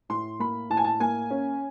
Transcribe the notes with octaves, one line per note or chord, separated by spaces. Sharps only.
A2 C6
A#3 B5
A2 A5
G#5
A5
A#3 G#5
C#4